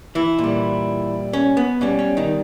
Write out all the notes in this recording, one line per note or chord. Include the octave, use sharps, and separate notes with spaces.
E3 E4
A#2
G3
C#4
B3
B2 G3 C#4
C#4
D#3 D#4